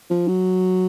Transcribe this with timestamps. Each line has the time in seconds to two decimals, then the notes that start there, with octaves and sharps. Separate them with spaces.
0.10 F3
0.28 F#3